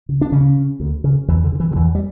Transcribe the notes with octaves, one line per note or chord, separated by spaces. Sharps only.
C#3
D4
D2 C#3 C#4
C#3
D2
C#3
E2 E3
D3
C#3
E3
D3
E2 E3
G3